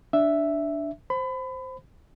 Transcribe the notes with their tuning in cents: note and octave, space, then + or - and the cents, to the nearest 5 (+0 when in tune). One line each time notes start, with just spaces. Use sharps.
D4 +0 E5 +0
C5 +0 B5 +30